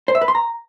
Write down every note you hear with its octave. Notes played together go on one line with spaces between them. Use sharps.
C5
E5
B4
C6
A#5